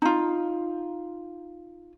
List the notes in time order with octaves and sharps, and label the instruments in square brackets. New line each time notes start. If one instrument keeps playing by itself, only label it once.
[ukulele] D#4 F4